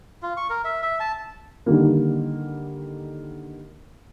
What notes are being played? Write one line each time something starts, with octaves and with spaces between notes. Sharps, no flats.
F4
C#6
A#4
E5
E5
A5
D3 D#3 G3 A#3